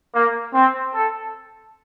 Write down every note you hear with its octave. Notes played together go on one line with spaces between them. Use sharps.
A#3
C4
A4